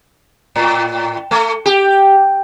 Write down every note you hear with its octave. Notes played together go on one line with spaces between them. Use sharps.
A2
A3
G4